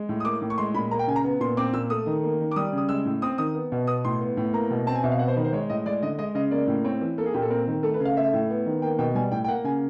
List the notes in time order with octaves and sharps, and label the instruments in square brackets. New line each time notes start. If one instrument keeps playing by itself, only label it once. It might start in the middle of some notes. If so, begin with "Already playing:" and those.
Already playing: [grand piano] G#3
A2
D#6
A#3 D6
A2
C#6
G#3 C6
A#2 B5
A#3 A#5
G5
C#3 G#5
A#5
B3
A#2 C6
C4 D6
A#2 E6
A3 D#6
D#3
A#3
D#3
D6
G3 D#6
C#3 D#6
G#3 E6
A2
C4 D#6
D#3 D#6
B3
B2
B3 D#6
A2 C6
B3
A2
A#3 A#5
B2
C4 A5
G#5
B2 E5
F5
B3 F#5
C5
D#3 B4
C5
G#3 C#5
A2 D#5
G#3 D5
D3 D#5
G#3 D#5
C#3 D#5
A#3 D5
A2
C4 C#5
E3
A#3 A4
G#4
A#2 G4
A4
C4 A#4
D#3
A3 A4
B4
C#3
F5
A3 E5
A2
B3
D#3
A#3 G5
B2 G5
G3 G#5
A2 G5
G5
A#3 F#5
C#3 G#5